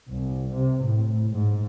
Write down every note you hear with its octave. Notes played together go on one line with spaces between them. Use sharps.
C2
C3
A2
G#2